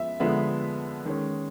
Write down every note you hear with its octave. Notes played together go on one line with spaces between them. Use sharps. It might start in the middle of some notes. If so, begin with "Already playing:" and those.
Already playing: F3 G#3 B3 E5
D3 F3 G#3 B3 E5
D#3 G#3 C#4